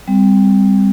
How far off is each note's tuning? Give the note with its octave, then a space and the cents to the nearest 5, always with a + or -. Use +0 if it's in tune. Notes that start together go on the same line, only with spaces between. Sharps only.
G3 +15 C4 -25